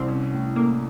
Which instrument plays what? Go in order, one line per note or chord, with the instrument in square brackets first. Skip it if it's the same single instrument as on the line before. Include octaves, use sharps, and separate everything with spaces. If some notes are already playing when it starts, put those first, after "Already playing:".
Already playing: [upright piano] C2 [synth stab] C4
[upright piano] C#4
A2
[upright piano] A3 [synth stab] A#3